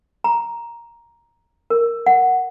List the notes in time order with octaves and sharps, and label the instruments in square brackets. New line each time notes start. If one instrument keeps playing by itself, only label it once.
[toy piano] A#5
A#4
F#5